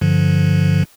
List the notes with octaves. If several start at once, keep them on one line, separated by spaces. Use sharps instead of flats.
G2 D3 F3